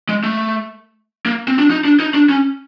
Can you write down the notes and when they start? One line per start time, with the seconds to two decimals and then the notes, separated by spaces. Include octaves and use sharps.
0.09 G#3
0.23 A3
1.26 A#3
1.48 C4
1.59 D4
1.70 D#4
1.85 D4
2.00 D#4
2.14 D4
2.29 C#4